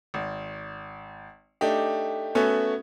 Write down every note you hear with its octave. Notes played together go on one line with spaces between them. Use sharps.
G#1
A3 D4 D#4 G4
A3 B3 C#4 F#4 A4